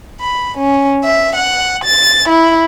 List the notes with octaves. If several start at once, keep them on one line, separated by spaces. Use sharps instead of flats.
B5
C#4
E5
F#5
A6
E4